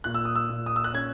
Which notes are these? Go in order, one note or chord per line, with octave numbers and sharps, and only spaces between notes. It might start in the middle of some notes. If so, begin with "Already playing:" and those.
A#2 F#6
E6
D#6
E6
A#2
D#6
E6
F#6
C#4 G#6